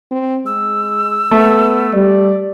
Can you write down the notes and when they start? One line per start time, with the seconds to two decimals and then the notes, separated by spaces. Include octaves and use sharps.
0.11 C4
0.46 G#3 E6
1.31 A3 B3
1.94 G3 D5